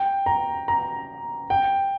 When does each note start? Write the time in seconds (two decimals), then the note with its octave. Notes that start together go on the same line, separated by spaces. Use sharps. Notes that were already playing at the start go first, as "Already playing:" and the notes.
Already playing: G5
0.26 A#5
0.68 A#5
1.50 G5